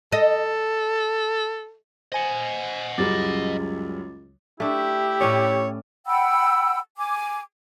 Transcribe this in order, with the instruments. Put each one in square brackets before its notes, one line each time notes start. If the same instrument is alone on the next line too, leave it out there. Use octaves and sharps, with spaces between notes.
[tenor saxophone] A4 [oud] D#5
[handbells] C5 G#5 [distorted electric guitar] D#5 F#5
[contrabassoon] C#2 [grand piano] F#2 G3 G#3 [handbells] D6 A6
[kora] A3 D4 [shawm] E4 [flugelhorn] G4
[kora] A2 C#4 D5 [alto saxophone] C#5
[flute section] F#5 G5 B5 E6
G#5 D6